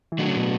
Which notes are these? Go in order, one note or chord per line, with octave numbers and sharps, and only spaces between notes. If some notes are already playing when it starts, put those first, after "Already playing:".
E3
D#3 F#3 A3 D4 F#4
C#3
B2